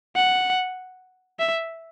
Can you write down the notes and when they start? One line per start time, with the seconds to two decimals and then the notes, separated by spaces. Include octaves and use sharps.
0.16 F#5
1.39 E5